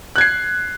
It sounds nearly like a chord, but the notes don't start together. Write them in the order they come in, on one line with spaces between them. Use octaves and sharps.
F#6 G#6 C7